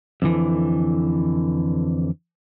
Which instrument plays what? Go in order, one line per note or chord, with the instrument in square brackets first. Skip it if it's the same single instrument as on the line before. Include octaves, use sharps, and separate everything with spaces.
[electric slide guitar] F2 D3 E3